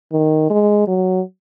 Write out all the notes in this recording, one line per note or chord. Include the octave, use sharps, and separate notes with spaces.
D#3
G#3
F#3